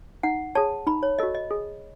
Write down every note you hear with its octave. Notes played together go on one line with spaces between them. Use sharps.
D#4 F#5
G#4 C#5 A5
D#4 B5
C#5
F#4 A4 D#5
D#5
G#4